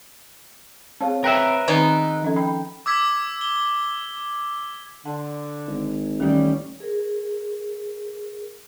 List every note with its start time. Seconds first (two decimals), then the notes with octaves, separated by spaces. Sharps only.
1.00 C4 G#4 C#5 F5 A5
1.24 A#4 B4 E5 G5 A#5
1.68 D#3 G#3 B3 C4 D#4 D#5
2.22 F3 C#4 A4
2.36 G5 B5
2.86 D6 E6 G#6 B6
3.41 G7
5.05 D3 F#5 A5 C6
5.67 G#1
6.20 A1 D#3 G3 A#3 C#4 D#4
6.80 G#4 A#4